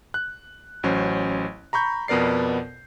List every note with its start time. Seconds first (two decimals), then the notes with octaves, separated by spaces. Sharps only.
0.14 F#6
0.83 A1 F#3 C#4 C5
1.73 A#5 B5 C#6 G6
2.08 F2 B2 B3 A#4 D5 C7